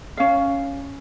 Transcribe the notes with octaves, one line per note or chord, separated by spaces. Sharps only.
C#4 F5